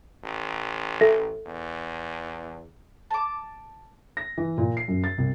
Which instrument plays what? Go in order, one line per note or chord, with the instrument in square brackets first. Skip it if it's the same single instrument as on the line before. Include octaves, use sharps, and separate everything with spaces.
[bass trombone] A1
[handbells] A4 E5 A#6
[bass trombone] E2
[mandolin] A5 D6
[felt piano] A#6
E3
A#2
C7
F#2
A6
C2